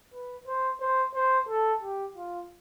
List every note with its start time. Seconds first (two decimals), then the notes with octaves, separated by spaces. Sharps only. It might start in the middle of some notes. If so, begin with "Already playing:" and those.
0.14 B4
0.47 C5
0.81 C5
1.15 C5
1.49 A4
1.82 G4
2.16 F4